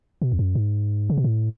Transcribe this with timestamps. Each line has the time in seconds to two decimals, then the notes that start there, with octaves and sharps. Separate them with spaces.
0.22 B2
0.32 E2
0.39 F#2
0.55 G#2
1.10 C#3
1.17 B2
1.24 A2